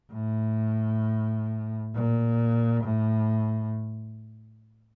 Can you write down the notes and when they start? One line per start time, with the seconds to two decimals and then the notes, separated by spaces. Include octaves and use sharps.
0.12 A2
1.94 A#2
2.84 A2